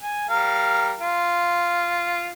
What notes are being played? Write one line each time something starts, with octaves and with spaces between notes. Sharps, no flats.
G#5
G3 A#4 F5
F4